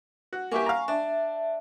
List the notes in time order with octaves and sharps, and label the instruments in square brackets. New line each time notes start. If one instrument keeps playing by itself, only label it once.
[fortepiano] F#4
[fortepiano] A#3 E4 G4 [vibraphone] G#5 C#6
[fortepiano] F5 A#5
[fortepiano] D4 [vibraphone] E5